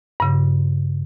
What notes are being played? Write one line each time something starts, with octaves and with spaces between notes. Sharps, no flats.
G2 C#3